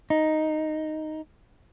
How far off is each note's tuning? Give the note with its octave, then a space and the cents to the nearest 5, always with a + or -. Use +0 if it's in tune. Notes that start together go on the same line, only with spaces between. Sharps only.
D#4 +0